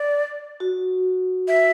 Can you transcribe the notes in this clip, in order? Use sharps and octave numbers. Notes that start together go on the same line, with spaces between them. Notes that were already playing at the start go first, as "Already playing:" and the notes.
Already playing: D5
F#4
E5